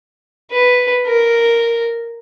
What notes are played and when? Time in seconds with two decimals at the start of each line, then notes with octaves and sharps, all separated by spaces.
0.51 B4
1.06 A#4